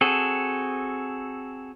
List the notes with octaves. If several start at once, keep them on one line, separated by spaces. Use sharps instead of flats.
C4 F#4 G#4 A4